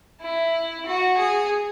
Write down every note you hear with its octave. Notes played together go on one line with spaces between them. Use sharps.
E4
F#4
G#4